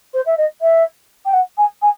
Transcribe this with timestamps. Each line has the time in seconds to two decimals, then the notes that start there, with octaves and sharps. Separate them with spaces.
0.13 C5
0.25 E5
0.37 D#5
0.61 E5
1.25 G5
1.33 F#5
1.57 G#5
1.82 G#5